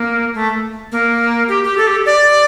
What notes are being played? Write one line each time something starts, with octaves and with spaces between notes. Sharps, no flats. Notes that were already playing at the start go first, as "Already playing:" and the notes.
Already playing: A#3
A3
A#3
G4
G4
A4
G4
D5